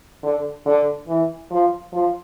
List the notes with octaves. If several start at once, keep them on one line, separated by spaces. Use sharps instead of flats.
D3
D3
E3
F3
F3